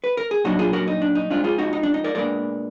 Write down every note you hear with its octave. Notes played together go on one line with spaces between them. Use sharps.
B4
A#4
G#4
A#2 F#3 D4 D#4 F#4
F4 G#4
F#4 A#4
D#4
D4
D#4
F2 F3 G#3 D4 F4
F4 G#4
D#4 F#4
D#4
D4
D#4
A#4 D5
A#2 G#3 B3 D4 A#4 D5